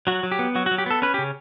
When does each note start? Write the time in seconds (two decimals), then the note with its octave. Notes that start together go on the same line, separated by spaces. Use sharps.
0.07 F#3 F#4
0.23 F#3
0.32 G4
0.39 B3
0.55 F#3 F#4
0.66 F#4
0.71 F#3
0.78 G4
0.86 B3 A4
1.02 C#4 B4
1.14 G4
1.18 C#3